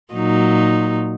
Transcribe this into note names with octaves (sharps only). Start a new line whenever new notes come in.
A#2 F#3 D#4